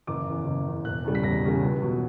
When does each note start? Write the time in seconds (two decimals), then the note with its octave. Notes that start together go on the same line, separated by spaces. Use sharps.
0.07 F#1 D6
0.27 E2 C#3
0.46 F#1
0.66 E2 C#3
0.85 E1 F#6
1.04 E2 C#3 G3
1.15 B6
1.23 E1 A#6
1.43 E2 C#3 G3
1.62 C#2
1.82 B2 F#3